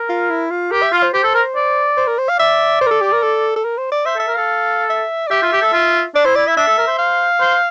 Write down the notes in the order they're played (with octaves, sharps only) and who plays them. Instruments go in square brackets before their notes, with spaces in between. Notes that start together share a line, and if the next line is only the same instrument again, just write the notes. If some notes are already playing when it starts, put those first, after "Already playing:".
Already playing: [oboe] A#4
[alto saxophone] F4
E4
F4
[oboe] G4 [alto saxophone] A#4
[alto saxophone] E5
[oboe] F4 [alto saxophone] F5
[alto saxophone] C5
[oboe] G4 [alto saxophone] C5
[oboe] A4
A#4
D5
[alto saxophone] C5
A#4
C5
F5
[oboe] D5 [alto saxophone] E5
[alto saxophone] C5
A#4
A4
G4
A#4
A4
A4
A#4
C5
D5
[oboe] C5 [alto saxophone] E5
[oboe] A4
[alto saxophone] E5
[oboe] A#4
[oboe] A4 [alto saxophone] F5
[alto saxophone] E5
D5
[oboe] G4 [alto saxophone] E5
[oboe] F4
G4
A4
F4
[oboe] D4 [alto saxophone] D5
[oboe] E4 [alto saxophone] C5
[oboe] E4 [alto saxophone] D5
[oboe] E4 [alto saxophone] E5
[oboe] D4 [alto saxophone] E5
[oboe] A4
A#4
C5
[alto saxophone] F5
[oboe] C5